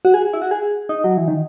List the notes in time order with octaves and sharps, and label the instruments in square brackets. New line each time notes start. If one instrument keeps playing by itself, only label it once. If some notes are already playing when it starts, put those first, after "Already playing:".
[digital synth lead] F#4
G#4
E4
F#4
G#4
D#4
F#3
E3
D#3